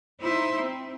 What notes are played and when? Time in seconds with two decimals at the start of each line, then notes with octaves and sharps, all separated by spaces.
0.21 D#4 E4 C5 E5 A#5 C6
0.61 C4